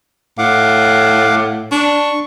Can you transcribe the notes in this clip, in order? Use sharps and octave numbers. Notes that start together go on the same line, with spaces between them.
A2 F5 F#5 D6
D4 C#6